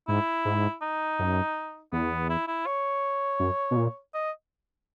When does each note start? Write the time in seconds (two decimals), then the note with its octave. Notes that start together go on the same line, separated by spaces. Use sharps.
0.08 G#2 E4
0.45 G#2
0.82 D#4
1.19 F#2
1.92 E2 B3
2.30 E4
2.48 E4
2.66 C#5
3.39 F#2
3.71 B2
3.77 A#2
4.14 D#5